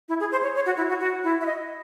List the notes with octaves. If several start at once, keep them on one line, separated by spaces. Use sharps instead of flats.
E4
G#4
C5
C#5
C#5
F#4
E4
F#4
F#4
E4
E5
D#5